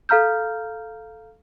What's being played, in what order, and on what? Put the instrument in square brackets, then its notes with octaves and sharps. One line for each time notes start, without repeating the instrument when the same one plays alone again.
[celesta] A4 F5 A#5 F6 G6